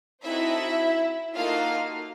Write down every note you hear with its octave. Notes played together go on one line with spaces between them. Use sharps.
C4 D#4 E4 F#4 A4 E5
A#3 D#4 F4 F#4 A4 F5